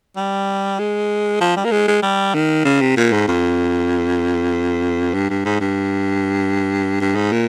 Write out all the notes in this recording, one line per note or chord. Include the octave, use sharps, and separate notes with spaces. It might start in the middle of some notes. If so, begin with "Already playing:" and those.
G3
G#3
F3
G3
A#3
G#3
G#3
G3
D#3
C#3
C3
A#2
G#2
F2
G2
G2
G#2
G2
G2
G#2
A#2